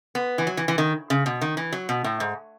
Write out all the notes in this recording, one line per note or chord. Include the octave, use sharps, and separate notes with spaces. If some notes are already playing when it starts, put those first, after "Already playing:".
B3
E3
F#3
E3
E3
D#3
C#3
B2
D#3
E3
F#3
B2
A2
G#2